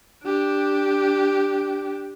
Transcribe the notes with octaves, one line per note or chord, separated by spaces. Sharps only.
D4 G4